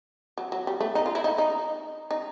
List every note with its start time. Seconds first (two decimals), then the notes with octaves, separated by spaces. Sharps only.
0.38 F#3
0.52 F#3
0.67 G3
0.81 A3
0.95 D#4
1.06 F4
1.15 E4
1.24 D#4
1.38 D#4
2.11 D#4